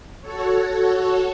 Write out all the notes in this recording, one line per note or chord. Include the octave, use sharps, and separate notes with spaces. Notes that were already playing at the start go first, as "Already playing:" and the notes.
F#4 A4 C#5